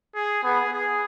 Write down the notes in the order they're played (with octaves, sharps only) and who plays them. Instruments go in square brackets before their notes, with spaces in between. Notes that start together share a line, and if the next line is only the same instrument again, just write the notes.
[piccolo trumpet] G#4
[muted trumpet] B3 [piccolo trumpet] G#4
[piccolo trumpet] G#4